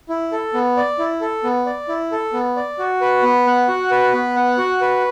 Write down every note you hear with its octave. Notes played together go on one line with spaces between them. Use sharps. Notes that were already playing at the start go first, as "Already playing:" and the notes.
E4
A4
B3
D5
E4
A4
B3
D5
E4
A4
B3
D5
F#4
B4
B3
F#5
F#4
B4
B3
F#5
F#4
B4